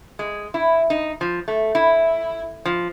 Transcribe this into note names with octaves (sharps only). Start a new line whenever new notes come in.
G#3
E4
D#4
F3
A3
E4
F3